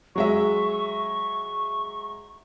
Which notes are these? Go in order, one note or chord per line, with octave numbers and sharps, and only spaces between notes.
F#3 G#3 E5 C#6